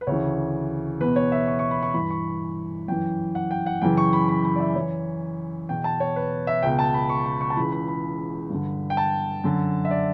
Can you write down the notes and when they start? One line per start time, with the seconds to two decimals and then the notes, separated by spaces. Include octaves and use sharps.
0.01 B4
0.07 D2 C#3 E3 C#5
1.00 E2 B2 B4
1.16 C#5
1.32 E5
1.48 C#6
1.59 C#6
1.71 B5
1.83 C#6
1.94 G2 E3 B5
2.11 C#6
2.88 F#2 E3 G5
3.35 F#5
3.51 G5
3.66 F#5
3.82 F#2 C#3 E3 G5
3.97 C#6
4.13 B5
4.29 B5
4.45 B5
4.56 D5
4.60 E5
4.76 F#2 E3 C#5
5.69 E2 B2 G5
5.84 A5
6.00 C#5
6.16 B4
6.47 E5
6.63 C#2 B2 G5
6.79 A5
6.94 B5
7.09 C#6
7.26 B5
7.41 C#6
7.50 A5
7.57 C#2 C#3 E3 B5
7.72 B5
7.88 B5
8.50 G2 D3
8.90 G5
8.97 A5
9.44 F#2 D3
9.85 E5
9.91 D5